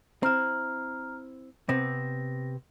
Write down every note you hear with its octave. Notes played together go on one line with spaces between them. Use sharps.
C4 E4 A#5 F6
C3 B3 C4 A#6